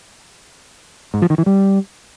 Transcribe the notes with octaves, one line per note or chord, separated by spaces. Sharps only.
G#2
F3
D#3
E3
G3